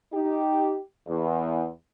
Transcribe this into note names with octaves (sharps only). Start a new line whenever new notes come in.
D#4 G4
E2